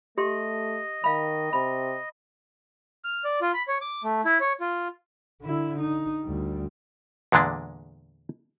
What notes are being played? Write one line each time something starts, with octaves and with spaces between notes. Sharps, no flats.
A3 G4 D#5 C6
D#3 F5 B5
C3 B5
F6
D5
F4
B5
C#5
D6
A3
E4
C#5
F4
D3 E4
D#4
D2 G3
E2 A#2 D3 G#3 D4